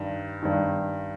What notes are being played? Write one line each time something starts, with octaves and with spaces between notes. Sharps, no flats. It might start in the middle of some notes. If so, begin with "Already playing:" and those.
Already playing: G2 D#3
G2 D#3